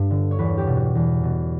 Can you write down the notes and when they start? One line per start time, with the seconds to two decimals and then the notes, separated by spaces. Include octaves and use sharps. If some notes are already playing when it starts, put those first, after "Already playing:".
Already playing: G2 B4
0.11 D3
0.31 C#5
0.39 E2 B4
0.58 G4
0.67 B2
0.77 F#4
0.95 E2
1.23 B2